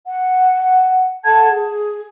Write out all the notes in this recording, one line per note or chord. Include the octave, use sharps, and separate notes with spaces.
F#5
A4 F#5 A5 G#6
G#4